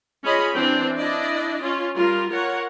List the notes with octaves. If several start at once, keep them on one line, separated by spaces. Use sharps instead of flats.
C#4 F4 G#4 D#5 B5
E3 C4 D4 G5
D4 E4 D5 D#5
C#4 F4
G3 F4 A#4
F4 A#4 C#5 F#5